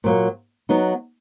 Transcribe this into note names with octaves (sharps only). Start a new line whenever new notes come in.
A#2 F#3 A#3
F#3 B3 D#4